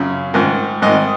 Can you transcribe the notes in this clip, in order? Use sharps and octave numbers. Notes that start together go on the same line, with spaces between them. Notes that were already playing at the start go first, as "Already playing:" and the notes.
Already playing: F#2 C#3
G#2 D#3
G#2 D#3 D#5